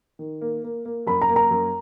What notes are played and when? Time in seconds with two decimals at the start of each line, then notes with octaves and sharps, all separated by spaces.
0.19 D#3
0.41 A#3
0.64 A#3
0.85 A#3
1.07 F#2 B5
1.22 A#5
1.29 A#3
1.36 A#5
1.51 F#2